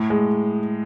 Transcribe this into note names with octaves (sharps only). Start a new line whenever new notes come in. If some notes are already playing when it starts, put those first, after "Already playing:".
Already playing: A2
G#3